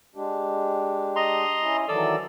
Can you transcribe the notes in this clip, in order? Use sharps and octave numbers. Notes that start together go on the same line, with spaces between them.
G#3 D4 G4
D#5 A#5 C6
C#4 E4
D#3 E3 F#3 A4 D5 E6